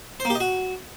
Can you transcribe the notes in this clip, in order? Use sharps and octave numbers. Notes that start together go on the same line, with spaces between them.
C5
A#3
G4
D#5
F#4